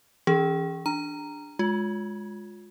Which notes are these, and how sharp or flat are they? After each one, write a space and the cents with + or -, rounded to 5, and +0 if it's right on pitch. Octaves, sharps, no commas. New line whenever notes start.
E3 +0 C#4 +0 G#4 -35
D4 +0 A#5 -5
G#3 +0 F4 +25